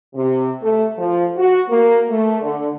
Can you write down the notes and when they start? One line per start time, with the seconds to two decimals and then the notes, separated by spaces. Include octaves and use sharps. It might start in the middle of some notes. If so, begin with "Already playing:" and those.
0.14 C3
0.62 A3
0.98 F3
1.35 F#4
1.70 A#3
2.09 A3
2.42 D3